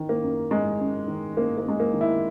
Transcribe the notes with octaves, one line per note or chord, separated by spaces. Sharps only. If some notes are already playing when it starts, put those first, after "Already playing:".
Already playing: D#3
A#3
F#2
F#2 G#3
F#2
D#3
F#2 A#3
A#3
F#2 G#3
A#3
D#3
E4